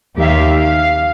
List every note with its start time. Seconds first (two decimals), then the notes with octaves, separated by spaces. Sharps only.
0.15 D#2 D#3 G4 E5 F5
0.54 F5